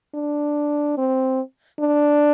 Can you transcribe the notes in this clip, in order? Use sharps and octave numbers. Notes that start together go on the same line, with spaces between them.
D4
C4
D4